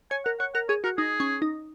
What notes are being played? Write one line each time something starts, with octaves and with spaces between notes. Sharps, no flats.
C#5 G#5
A#4 F#5
C#5 F#5
A#4 F#5
G#4 C#5
F#4 A#4
D#4 G#4
C#4
D#4